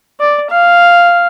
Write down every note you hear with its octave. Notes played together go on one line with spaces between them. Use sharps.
D5
F5